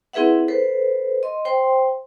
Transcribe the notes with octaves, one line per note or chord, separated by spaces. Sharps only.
C4 E4 G#4 B4 E5 F#5
A4 B4 C5
D#5 C6
C5 G5 C6